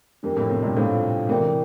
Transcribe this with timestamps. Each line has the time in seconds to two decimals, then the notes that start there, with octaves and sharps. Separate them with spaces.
0.23 F2 D4 G4 A#4
0.36 F2 A2
0.49 A2 C3
0.63 G2 A#2
0.76 A2 C3 D4 F4 A4 C5 F5
1.29 C3 E3 E4 A#4 D5 G5